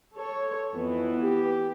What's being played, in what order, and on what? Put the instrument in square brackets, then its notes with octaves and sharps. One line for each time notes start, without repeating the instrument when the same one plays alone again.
[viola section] A4 C#5
[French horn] F2 [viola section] E3 B3 E4
[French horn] G4